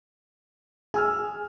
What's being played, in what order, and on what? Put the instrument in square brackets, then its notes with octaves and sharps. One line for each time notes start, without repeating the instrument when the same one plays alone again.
[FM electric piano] G#4 [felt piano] G#5 E6 F6